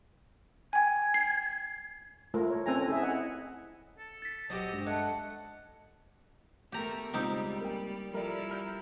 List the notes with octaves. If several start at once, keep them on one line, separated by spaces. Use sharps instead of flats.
G5 G#5 G#6
C7
A3 F4 A#4
C#5
C4 C#4 A4 G#5 A#5
E4 G#4 E5
D#5 F#5 G#5
A4
A6 B6
A#1 F#3 C4 F#4 G4 D#5
G2 G#3 D4
A3 D#5 F#5 A5
A3 B3 G4 A#4 A#5
C#2 G3 C4 D#4 G4 E6
A#3 G5
F3 G3 E4 A4 A#4 D5
A#5 F6 G6